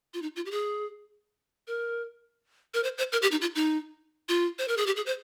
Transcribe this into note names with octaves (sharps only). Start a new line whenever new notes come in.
F4
D#4
F4
G4
G#4
A#4
A#4
C5
C5
A#4
G4
D#4
F4
D#4
F4
C5
A#4
G#4
G4
G#4
C5